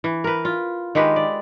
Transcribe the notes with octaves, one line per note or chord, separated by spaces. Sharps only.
E3
A#4 B4
F4
D#3 G#3 G4 B4
D5